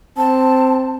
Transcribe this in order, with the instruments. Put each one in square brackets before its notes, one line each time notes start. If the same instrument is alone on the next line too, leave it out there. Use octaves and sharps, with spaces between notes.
[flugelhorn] C4 [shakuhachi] A5